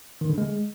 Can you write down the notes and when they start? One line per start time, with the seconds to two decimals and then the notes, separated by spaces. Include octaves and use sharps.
0.21 D#3
0.30 D3
0.38 G#3